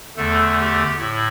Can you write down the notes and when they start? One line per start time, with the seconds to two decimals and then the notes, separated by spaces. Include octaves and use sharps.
0.17 E2 D3 A3 A4
0.58 G4
0.99 A2 E4